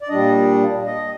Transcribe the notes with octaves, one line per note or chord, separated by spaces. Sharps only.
D5
A#2 G3 D4 D#5
D#5